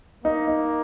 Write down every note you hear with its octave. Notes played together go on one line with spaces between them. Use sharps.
A#3 D#4
D#4